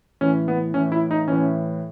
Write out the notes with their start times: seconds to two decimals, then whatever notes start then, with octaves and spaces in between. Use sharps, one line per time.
0.21 A2 E3 C#4
0.48 B3
0.74 A2 E3 C#4
0.92 E4
1.11 D#4
1.28 A2 E3 C#4